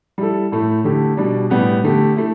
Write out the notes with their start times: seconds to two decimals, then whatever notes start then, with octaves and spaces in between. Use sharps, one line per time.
0.18 G3 E4 A4
0.52 A2 A3 E4
0.84 D3 A3 G4
1.17 B2 G3 D4
1.50 A2 G3 B3 G4
1.84 D3 A3 G4
2.16 A3 E4